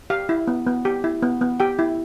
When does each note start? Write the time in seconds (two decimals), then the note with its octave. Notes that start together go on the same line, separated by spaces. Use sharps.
0.10 G4 F5
0.29 E4
0.47 B3
0.67 B3
0.85 G4
1.04 E4
1.23 B3
1.41 B3
1.60 G4 G5
1.79 E4